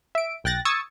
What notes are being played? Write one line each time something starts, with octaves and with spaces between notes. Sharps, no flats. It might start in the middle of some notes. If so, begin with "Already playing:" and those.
E5 D7
B1 G5 F#6 A6 A#6
C#6 D#6 E6 G#6 A6 C#7